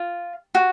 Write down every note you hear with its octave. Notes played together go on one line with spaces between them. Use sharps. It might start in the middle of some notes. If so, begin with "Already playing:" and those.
Already playing: F4
F#4